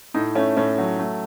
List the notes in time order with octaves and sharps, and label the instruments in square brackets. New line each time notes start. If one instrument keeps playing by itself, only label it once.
[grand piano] A2 D#4
A3 C#4
A2 C#4
F#3
A3